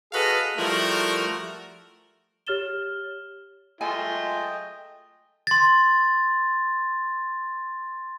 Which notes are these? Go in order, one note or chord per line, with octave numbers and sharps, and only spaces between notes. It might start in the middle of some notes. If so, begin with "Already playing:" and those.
F#4 G#4 A4 B4 D#5 F5
F3 G3 A3 E4 F#4 A#4
G4 C#5 F6 A6 E7 G7
F#3 G#3 A3 F4 D#5 G5 G#5
C6 A6